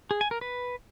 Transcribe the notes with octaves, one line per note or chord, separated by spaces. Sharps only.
G#4
G#5
A#4
B4